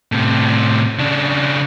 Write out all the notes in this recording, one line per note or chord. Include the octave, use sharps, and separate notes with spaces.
A2 C3
C#3 D4